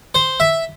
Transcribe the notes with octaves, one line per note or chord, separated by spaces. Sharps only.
C5
E5